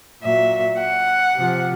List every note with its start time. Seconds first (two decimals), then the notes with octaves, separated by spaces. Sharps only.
0.23 A#2 F#3 E5
0.80 F#5
1.36 C3 F3